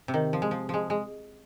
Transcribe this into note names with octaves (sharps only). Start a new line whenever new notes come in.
C3
D#3
F3
G#3
F3
F3 G#3
G#3